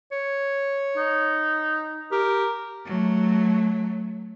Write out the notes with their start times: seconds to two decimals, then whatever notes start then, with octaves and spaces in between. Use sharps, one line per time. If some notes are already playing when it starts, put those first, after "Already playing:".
0.12 C#5
0.97 D#4
2.12 G4 A#4
2.86 F#3 A3